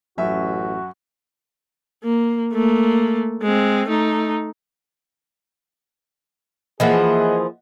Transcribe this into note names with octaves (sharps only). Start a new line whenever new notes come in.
A1 F#2 F#4 E5
A#3
A3 A#3
G#3 C4
A3 D#4
E3 F3 A#3 G#4 D#5 E5 F#5